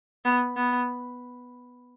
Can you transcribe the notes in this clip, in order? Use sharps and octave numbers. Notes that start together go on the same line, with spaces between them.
B3
B3